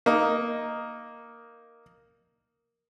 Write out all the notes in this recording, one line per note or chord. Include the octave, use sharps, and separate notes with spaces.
A#3 D#4